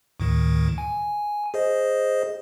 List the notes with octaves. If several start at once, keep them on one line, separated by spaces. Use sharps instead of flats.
D2 A2 D#3
G#5
G#4 C5 D#5